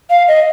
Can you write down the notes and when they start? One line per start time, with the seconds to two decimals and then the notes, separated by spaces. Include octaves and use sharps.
0.10 F5
0.28 D#5